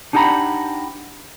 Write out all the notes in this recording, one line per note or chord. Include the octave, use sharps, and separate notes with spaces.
D4 D#4 G4 F#5 A#5 B5